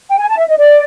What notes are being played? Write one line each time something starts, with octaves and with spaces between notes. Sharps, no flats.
G5
G#5
A5
E5
D#5
D5